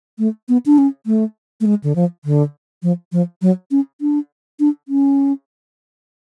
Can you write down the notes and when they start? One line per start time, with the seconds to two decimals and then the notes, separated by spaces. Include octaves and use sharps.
0.18 A3
0.49 B3
0.66 D4
0.78 C#4
1.06 A3
1.61 A3
1.66 G#3
1.84 D3
1.96 F3
2.25 D3
2.83 F3
3.12 F3
3.42 F#3
3.71 C#4
4.01 D4
4.60 D4
4.88 C#4